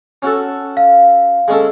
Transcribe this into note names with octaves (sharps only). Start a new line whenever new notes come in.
C#4 F#4 A4
F5
G#3 C#4 A4